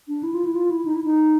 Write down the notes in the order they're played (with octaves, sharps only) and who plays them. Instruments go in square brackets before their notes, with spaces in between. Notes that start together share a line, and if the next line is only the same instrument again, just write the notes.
[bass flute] D4
E4
F4
E4
F4
E4
D#4
E4
D#4